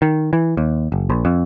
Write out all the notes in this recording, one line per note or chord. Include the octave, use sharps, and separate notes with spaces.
D#3
E3
D#2
F#1
A#1
F2